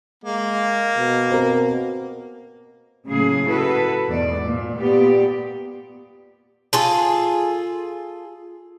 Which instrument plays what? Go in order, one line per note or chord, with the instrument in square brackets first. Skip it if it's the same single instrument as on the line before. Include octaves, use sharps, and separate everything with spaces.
[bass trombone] G#3 [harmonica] A#3
[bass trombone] B2
[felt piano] C4 A#4
[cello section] A2 C#3 F#3 A#3 G#4
E4 F#4 A4 B4
E2 G#2 B2 D5
A#2
A#2 B3 G4 D5
[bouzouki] F4 G#4 A4